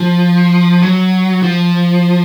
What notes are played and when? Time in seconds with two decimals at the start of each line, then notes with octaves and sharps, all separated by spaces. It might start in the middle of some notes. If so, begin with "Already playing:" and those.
Already playing: F3
0.82 F#3
1.43 F3